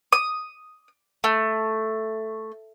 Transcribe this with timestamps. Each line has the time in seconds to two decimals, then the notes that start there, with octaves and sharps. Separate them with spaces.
0.13 D#6
1.24 A3